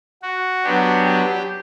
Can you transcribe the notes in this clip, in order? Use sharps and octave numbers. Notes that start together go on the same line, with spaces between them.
F#4
F#3 B3 D4 G4
G4